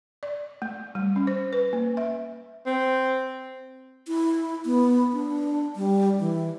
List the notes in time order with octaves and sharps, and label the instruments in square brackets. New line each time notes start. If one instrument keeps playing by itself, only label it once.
[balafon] D5
A3
G3
C#4
C5
B4
A#3
E5
[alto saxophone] C4
[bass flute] E4
B3
D4
G3
E3